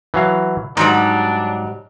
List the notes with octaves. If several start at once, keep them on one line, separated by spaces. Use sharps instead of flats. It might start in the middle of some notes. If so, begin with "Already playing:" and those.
E3 F#3 F5
G#2 F#3 G3 D4 D#4